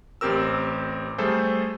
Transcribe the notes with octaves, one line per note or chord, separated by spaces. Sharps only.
A1 C4 G4 A#4 E6
G3 A3 G#4 A4 C5